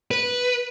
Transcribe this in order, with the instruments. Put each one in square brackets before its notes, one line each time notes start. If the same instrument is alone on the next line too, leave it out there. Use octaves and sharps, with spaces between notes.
[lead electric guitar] B4